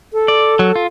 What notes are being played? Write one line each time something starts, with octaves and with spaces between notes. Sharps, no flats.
A4
D5
F#3
F4